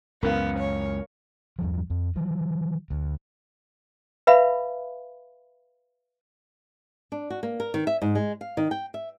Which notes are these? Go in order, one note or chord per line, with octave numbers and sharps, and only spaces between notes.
C#2 F#2 C#3 B3 A#4 F5
C#5
E2 G2 F3
F2
D#3 E3 F#3
D2
B4 E5 F5 B5
D4
F#4
A#3
A#4
D#3
E5
G#2
G#3
F5
D#3
G5
E5